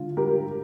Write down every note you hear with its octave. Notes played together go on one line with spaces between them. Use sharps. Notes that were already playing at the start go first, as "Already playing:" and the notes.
Already playing: D3 F4
D3 G4 A#4